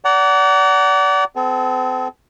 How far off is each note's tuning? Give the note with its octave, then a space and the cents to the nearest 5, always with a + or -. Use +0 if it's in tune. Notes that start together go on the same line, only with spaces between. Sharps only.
D5 -30 F#5 +25 A#5 -30
C4 -40 A4 -35